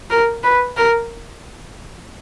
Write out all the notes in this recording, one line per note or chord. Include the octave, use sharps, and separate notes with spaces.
A#4
B4
A#4